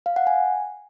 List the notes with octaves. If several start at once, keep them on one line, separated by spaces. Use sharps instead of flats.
F5
F#5
G#5